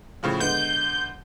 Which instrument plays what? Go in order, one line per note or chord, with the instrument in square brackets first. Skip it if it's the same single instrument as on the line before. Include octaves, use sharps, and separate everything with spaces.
[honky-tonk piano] A2 C#3 F3
[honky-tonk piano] D3 G#3 B3 [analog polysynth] G6